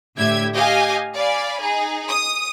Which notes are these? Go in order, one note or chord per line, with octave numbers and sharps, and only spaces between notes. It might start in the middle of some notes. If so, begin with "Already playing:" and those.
A2 D3 G4 E5 G#6
G4 D#5 F5 G#5
D5 F5 G#5 B5
D#4 G#4
D#6